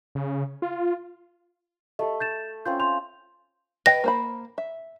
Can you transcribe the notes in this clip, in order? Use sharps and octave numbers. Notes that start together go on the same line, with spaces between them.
C#3
F4
A3 G4 D#5
G6 A6 E7
C4 C#4 F4 G6
C6 G6 F7
B4 D#5 G5 A#6
A#3 C5 B5
E5